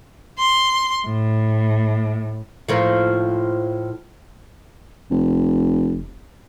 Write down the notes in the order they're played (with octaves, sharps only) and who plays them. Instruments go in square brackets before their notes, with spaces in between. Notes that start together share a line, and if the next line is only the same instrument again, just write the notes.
[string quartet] C6
A2
[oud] A2 F3 A#3
[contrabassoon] F1